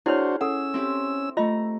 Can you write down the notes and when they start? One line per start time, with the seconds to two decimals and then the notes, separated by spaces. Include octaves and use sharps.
0.06 D4 E4 F#4 G#4 C5 C#5 F6
0.41 C#4 A4 F#5 E6
0.74 C4 E4 G4
1.37 A3 F4 D#5 A#5